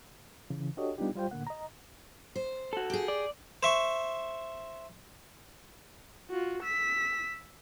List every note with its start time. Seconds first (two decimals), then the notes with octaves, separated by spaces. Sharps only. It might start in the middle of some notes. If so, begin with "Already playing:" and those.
0.50 C#3 E3
0.77 D4 F#4 G4 A4 C#5 D#5
0.98 G3 B3 D4 D#4 F4 G4
1.15 G3 F4 C5 G5
1.31 A2 D3 A#3 F#5
1.47 D#5 A#5
2.36 C5
2.73 F#4 A4
2.90 G4 G#4
3.08 D5
3.63 C5 E5 C#6
6.30 F4 F#4
6.63 E6 B6